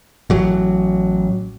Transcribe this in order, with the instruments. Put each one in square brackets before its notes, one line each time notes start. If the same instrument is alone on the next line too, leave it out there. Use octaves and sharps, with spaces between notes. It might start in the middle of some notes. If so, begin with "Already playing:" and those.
[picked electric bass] A1 F#3